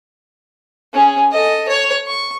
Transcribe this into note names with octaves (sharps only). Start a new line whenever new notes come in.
C#4 G#4
A4 D#5
C#5
C#6